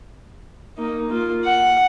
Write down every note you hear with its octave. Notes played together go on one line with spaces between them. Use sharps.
A#3 D#4
A#3 F4
F#5